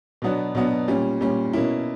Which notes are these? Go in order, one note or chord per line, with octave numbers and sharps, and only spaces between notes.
B2 F#3 B3 D4
B2 F#3 B3 D4
A#2 G3 C#4
A#2 G3 C#4
B2 A#3 C#4 E4